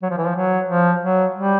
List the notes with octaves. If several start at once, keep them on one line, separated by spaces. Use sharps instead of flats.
F#3
F3
E3
F3
F#3
F3
F#3
G3